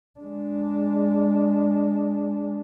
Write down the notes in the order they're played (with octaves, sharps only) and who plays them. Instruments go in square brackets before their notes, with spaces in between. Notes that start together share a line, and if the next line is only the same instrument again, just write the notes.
[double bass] G#3 D4